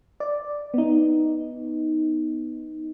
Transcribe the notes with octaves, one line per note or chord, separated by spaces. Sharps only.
D5
B3 D#4